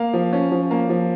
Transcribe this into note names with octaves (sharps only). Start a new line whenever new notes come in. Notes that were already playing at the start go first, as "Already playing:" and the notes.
Already playing: A#3 F5
F3
C#4
F3
A#3
F3